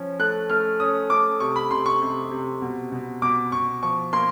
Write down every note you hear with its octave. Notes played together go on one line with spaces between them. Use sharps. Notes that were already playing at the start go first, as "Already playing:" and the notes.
Already playing: F3 C#4
A3 F#6
A3 F6
C#4 D#6
A3 D6
C3 C#6
B5
C3 C6
C#6
C3
C3
B2
B2
B2 D6
B2 C#6
F3 C#6
A#3 C6